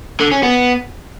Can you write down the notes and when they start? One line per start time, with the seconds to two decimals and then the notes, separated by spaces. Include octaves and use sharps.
0.20 D3
0.31 C#4
0.43 B3